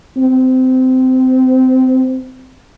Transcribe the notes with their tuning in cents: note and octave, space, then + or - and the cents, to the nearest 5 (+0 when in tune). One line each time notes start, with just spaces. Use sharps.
C4 -20